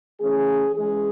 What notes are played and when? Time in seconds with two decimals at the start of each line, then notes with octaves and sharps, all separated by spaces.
0.20 E3 A3 C#4 G#4
0.74 E3 G#3 C#4 G#4